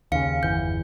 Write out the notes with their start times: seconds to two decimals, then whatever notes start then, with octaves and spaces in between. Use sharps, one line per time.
0.12 D#2 C#3 F5 C#7
0.43 G1 E2 E3 G6